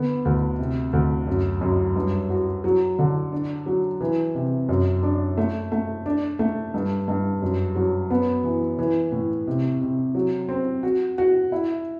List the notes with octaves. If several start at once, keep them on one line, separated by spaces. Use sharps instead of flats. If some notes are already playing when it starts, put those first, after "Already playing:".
Already playing: D3 B3
D2
C3
D2
F#2
F#2
G2
F#4
F#3
D3
D4
F#3
E3
C3
F#2
D4
A3
A3
D4
A3
G2
G2
F#2
F#3
B3
E3
E3
A2
C3
C3
F#3
C4
F#4
F#4
E4